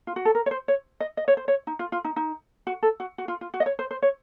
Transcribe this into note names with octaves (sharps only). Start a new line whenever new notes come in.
F4
F#4
A4
A#4
C#5
C5
C#5
D#5
D#5
C#5
C5
C#5
D#4
F4
F4
D#4
D#4
F#4
A4
F#4
F#4
F4
F4
F#4
D#5
C#5
C5
C5
C#5